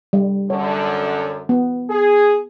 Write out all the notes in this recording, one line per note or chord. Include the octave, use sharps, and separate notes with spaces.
G3
F#2 D3 C#5
B3
G#4